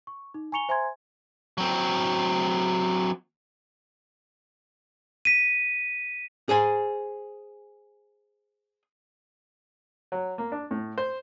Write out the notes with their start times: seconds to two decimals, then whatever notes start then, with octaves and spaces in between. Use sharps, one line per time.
0.07 C#6
0.34 D#4
0.52 G#5 A#5 C#6 C#7 F7 G7
0.69 C5 E5 G#5 A#5 C6 G#6
1.58 F#3 C4
5.25 B6 D#7
6.49 G#4 C5 G#5
10.12 F#3
10.38 A#3
10.52 D4
10.71 A2
10.98 C5